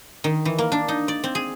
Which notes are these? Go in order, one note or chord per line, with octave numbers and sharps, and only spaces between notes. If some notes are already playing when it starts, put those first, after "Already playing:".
D#3
E3
A#3
D4
D#4
D5
C4
G#4